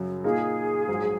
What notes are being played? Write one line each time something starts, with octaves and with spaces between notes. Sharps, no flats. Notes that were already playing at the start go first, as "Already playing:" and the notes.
Already playing: F#2 C#3 F#3
A#2 A#3 D#4 G#4
A#1 G#2 F#3